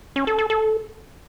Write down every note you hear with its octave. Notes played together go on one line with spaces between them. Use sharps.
C#4
A4
A4
A4